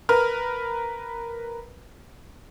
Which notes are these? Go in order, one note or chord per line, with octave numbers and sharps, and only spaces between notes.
A#4 B4 F6